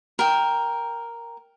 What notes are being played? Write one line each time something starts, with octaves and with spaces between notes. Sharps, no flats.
A#4 G5